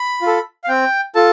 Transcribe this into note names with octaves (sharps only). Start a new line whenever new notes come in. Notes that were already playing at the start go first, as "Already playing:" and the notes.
Already playing: B5
F4
A4
F5
C4 G5
F4 A4 A5